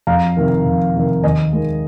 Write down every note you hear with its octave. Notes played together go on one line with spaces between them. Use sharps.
F2 F5 A#5
C3 D#3
F2
C3 D#3
D#2 D#5 G#5
D#3 G#3